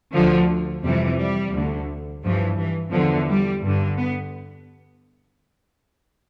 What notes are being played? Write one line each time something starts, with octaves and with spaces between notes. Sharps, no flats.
D2 D3 F3
F2 C3 E3 G3
G3
D2 D3
G2 E3 F3
E3
E2 D3 F3
G3
G2 D3
B3